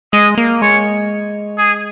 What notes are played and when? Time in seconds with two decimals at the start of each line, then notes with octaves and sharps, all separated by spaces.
0.13 G#3 D#5
0.38 A#3
0.62 G#3 C#5
1.58 G#4